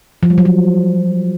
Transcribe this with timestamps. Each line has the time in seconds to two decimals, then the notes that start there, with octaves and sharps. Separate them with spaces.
0.23 F3
0.30 G3
0.38 F#3
0.45 F3